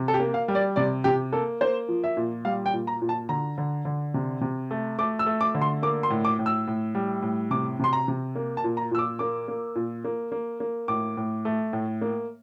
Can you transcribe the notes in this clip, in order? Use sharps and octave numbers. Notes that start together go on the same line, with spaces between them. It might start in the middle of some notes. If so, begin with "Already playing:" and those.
Already playing: C3
A4
G4
A#3
F5
G3
D5
C3 D5
C3 G4
A#3 A4
A#3 C5
F3
E5
A#2
G3 F5
G5
A#2
A#5
A#2
A5
D3 A#5
D3
D3
C3
C3
A3
A3 D6
E6
A3
D6
D3
C6
A#3 D6
C6
A2
D6
A2
E6
A2
G3
A2
C3 D6
C3 C6
A#5
C3
A#3
A5
A#2
A#5
A#2 E6
D6
A#3 D6
A#3
A#2
A#3
A#3
A#3
A2 D6
A2
A3
A2
A#3